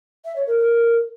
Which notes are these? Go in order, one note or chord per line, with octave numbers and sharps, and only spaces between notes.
E5
C#5
A#4
A#4